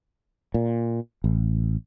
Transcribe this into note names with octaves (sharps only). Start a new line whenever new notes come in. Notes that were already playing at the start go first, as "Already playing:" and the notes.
A#2
A1